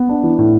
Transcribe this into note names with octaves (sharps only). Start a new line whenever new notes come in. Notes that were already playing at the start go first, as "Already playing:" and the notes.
Already playing: B3
D4
E3
A2